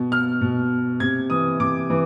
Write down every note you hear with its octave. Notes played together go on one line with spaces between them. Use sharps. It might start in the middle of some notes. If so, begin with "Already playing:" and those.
Already playing: B2
F6
B2
C3 G#6
E3 D#6
C3 D6
E3